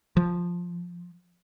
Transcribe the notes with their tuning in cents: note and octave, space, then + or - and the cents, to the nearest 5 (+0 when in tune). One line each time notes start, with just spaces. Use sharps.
F3 +5